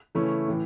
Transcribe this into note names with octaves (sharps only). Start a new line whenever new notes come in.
C#3 E3 A3 C#4 E4
A2 E3